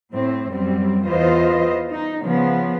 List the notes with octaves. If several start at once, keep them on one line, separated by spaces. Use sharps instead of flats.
A2 C4
F#2 G3 C4
E2 E3 F4 B4 C5 D#5
D#4
C#3 F3 B3